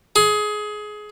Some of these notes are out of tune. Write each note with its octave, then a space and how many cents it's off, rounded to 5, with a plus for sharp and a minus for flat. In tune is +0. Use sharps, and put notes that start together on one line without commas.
G#4 +20